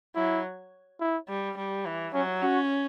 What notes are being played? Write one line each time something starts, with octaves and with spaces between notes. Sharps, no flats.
F#3 E4
E4
G3
G3
E3
F#3 C#4
C#4 F#4